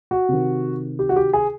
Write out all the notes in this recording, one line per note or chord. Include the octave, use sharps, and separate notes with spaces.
F#4
C3 D#3
G4
F#4
G4
G#4